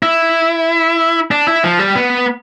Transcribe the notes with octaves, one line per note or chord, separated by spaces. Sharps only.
E4
D4
E4
F3
G3
B3